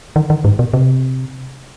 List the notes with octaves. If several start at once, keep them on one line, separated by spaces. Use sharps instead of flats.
D#3
D#3
G#2
B2
C3